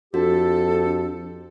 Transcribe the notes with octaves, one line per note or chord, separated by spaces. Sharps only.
F2 D4 F#4 G4 A4